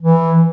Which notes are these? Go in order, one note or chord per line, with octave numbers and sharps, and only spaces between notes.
E3